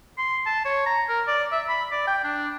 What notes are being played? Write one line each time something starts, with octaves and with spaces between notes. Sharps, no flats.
C6
A5
C#5
A#5
A#4
D5
E5
B5
D5
G5
D4